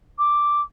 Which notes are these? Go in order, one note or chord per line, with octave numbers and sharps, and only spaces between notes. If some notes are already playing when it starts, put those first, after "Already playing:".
D6